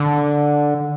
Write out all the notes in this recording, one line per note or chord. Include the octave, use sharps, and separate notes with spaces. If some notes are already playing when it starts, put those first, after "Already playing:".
Already playing: D3